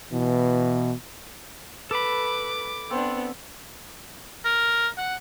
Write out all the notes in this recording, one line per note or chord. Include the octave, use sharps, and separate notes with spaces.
B2 E3
A4 B4 B5 D6
B3 C4 D4
A#4
F#5